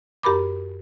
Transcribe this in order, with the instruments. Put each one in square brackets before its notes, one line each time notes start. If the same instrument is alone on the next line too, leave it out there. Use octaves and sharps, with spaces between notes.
[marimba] F#2 G4 A#4 B5 D6